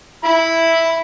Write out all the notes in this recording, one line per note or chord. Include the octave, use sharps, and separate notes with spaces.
E4 B5